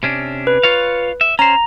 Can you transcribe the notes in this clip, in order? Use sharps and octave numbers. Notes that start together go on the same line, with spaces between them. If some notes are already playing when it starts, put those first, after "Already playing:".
C3 C#4 D4
B4
F4 C#5 F5
E5
C#4 C5 A#5